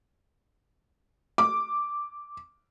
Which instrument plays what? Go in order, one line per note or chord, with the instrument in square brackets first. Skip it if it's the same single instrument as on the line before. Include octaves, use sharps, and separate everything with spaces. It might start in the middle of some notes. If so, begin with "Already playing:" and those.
[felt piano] D6